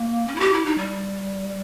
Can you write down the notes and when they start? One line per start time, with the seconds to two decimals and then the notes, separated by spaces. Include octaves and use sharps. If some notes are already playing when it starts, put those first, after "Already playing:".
Already playing: A#3
0.27 C#4
0.35 E4
0.40 G4
0.53 E4
0.65 D#4
0.78 G3